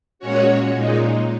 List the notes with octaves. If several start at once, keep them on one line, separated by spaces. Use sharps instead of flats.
A#2 G#3 C#4 F#4 C#5
A#2 G#3 D#4